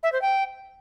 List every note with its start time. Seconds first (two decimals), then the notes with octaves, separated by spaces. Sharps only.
0.03 E5
0.12 C5
0.22 G5